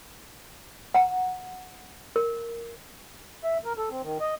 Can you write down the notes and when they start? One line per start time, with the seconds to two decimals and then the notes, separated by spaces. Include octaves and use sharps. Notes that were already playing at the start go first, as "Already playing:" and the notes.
0.94 F#5 A#5
2.16 A#4
3.44 E5
3.65 A#4
3.77 A4
3.90 C4
4.03 D#3
4.21 D#5